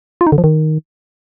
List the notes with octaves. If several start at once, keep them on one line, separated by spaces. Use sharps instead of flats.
F4
D#4
D3
F3
D#3